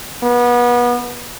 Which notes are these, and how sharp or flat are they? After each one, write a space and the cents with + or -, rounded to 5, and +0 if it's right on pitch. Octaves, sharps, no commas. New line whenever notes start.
B3 -30